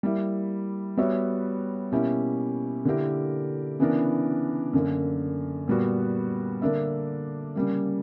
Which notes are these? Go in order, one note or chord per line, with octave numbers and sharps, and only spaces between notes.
G3 A#3 E4
G3 B3 F#4 C#5 E5
B2 A#3 C#4 E4 G4
D3 A#3 E4 G4 A#4
C#3 E3 B3 D4 A#4
F#2 D3 A#3
A#2 G3 B3 F#4
D3 A#3 D4 A#4 E5
C#3 G3 A#3